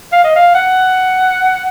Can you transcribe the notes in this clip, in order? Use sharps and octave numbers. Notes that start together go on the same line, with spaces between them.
F5
D#5
F5
F#5